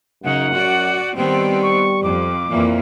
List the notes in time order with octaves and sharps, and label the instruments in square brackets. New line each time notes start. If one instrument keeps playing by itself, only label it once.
[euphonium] F#2 [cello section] C#3 D#4 [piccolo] F#5
[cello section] F#4 D5
[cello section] D#3 B3 C4 [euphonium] G3
[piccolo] C#6
[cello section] F2 [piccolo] D6
[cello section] F2 E3 A#3 [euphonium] A#2